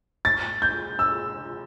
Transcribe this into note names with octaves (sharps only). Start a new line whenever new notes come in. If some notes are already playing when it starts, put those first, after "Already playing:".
A6
G6
E6